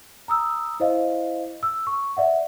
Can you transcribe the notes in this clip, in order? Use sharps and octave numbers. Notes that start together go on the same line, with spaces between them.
A#5 D#6 E6
E4 C5 D#5 F5
E6
C#6
D5 E5 F#5